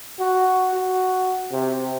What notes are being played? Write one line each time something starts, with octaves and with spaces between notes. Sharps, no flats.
F#4
F#4
C3